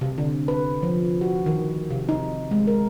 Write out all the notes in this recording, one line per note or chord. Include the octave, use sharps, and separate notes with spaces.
C3
D3
B4
F3
F#4
D#3
C3
D#4
G#3
A#4